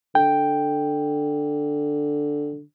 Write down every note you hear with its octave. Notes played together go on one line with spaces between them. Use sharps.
D3 G5